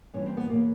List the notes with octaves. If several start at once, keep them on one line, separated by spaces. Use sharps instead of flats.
G2 E3 C#4
C4
B3
E2 B2 F#3 A#3